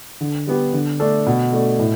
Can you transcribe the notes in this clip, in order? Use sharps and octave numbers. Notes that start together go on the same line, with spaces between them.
D3
G3 B3 G4
D3
A3 D4 A4
B2
A3 D4 A4
A2